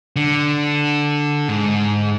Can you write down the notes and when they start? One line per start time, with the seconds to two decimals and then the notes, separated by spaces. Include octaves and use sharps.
0.16 D3
1.48 G#2